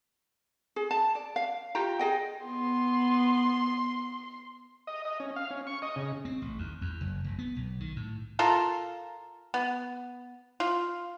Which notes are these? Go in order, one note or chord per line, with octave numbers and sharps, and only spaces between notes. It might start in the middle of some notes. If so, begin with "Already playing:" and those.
G#4
A5
D5
F5
F4 G4 G5 A#5
G#4 D#5 G5
B3 C6
D#5
D#5
C#4
F5
C#4
C#6
D#5
C#3
C4
A1
D#2
E2
F#1
F1
B3
B1
D#3
A2
F4 A4 A#4
B3
F4